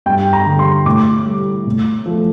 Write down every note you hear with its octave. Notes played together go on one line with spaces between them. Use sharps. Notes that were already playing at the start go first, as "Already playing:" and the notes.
G2 G5
A#5
D3 G3
C6
A2 D6
G3
A2
F3 A3